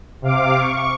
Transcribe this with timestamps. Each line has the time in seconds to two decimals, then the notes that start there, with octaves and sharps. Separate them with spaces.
0.22 C3 F5 D6
0.58 C#6